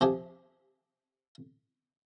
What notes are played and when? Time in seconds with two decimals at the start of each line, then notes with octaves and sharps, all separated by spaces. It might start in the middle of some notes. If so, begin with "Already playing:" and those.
0.01 C3 F3 G4 G#4